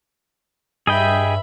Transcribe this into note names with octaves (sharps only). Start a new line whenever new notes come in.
G2 G#4 D#5 E5 G5 B5